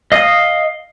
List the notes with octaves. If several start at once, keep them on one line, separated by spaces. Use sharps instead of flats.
D#5 F5 D#6